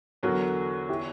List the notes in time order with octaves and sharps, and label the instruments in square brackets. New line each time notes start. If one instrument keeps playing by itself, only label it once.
[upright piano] E2 D3 F#3 [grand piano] F#4 A#4
[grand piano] E4 G4